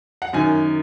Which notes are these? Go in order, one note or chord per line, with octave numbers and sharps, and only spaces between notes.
F#5
F#2 D#3 G#5